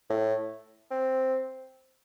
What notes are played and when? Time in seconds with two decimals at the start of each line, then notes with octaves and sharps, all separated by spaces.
0.10 A2
0.91 C4